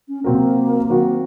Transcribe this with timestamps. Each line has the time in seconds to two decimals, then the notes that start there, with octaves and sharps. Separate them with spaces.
0.08 C#4
0.24 C3 F#3 A#3 C4 F#4 A#4
0.89 D#3 F#3 C4 F#4